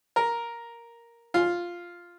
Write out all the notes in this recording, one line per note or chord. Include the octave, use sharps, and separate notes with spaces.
A#4
F4